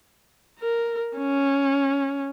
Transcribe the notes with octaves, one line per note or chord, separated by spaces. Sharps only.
A#4
C#4